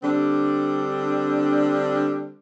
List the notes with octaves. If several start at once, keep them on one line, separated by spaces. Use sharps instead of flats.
D3 G3 C4 D4